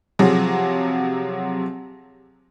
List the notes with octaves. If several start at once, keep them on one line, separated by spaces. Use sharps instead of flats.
C3 F3 F#3 G#4